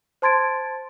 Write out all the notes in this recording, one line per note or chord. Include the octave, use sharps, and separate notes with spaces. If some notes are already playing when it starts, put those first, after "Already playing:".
C5 A5 C6 G#6 A6 D7